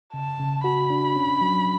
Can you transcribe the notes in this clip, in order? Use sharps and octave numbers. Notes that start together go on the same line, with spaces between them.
C#3 A5
C#3
F#4 B5
D4
C#4
F#3